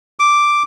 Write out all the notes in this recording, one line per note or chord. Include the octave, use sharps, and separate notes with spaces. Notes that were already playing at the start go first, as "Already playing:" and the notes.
D6